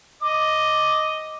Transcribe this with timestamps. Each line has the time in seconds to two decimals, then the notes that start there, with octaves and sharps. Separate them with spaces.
0.22 D#5 D6